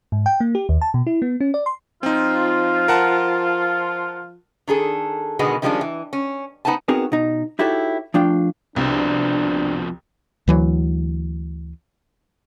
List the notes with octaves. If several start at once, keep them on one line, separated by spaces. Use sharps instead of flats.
G#2
G5
A#3
G4
D#2
A5
B2
E4
B3
C#4
D5
C6
F3 C4 D#4 F4
A#4 F#5 A5
D#3 D4 G#4 A4
B2 D3 D#3 G#3 B3 G#4
D#3 F3 G3 G#3 C#4 D4
E3
C#4
B3 D#4 C5 G#5 A5
B3 C4 D#4 F#4 G#4 A#4
B2 D#4
D#4 E4 F#4 G4 A4 C#5
F3 A3 D4 F4 G5
C2 F2 B2 D4 C5
D2 E3 F#3